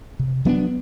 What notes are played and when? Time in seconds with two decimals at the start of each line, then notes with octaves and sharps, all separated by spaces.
0.19 C3
0.45 F#3 B3 D4